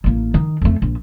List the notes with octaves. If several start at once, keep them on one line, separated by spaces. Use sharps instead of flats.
A1 A#3
D#3
F2 A3
A#1